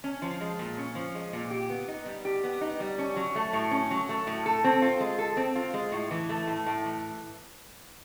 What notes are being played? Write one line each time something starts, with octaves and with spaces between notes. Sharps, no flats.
C#4
F3
G#3
A#2
C#4
F3
G#3
A#2
G4
B3
D#4
G3
G4
B3
D#4
G3
C#4
F#3
A3
A2
C#4
F#3
A3
A2
A4
C4
F4
G#3
A4
C4
F4
G#3
A2
E3
A3
A2
A2
E3